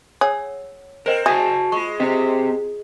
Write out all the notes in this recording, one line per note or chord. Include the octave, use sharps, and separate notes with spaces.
G#4 C#5 F#5 E6
C4 A#4 C5 D#5 F#5
F#4 G#4 E5 G#5 A5
G#3 F4 C#6
C4 G4 C5 D#5